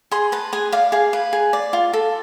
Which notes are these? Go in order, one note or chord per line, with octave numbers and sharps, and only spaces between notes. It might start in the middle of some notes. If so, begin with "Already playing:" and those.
G#4 C6
B4 A5
G#4 G#5
D5 F5
G#4 F5
B4
G#4
D5
F4
A4